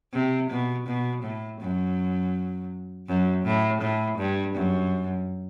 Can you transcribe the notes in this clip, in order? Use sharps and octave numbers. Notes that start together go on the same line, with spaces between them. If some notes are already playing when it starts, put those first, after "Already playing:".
C3
B2
B2
A2
F#2
F#2
A2
A2
G2
F#2